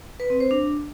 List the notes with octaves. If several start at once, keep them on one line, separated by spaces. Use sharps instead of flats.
B4
C4
C5
D4